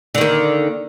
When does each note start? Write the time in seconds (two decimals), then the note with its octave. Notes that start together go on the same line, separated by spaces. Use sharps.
0.15 D3
0.18 D#3
0.21 A#3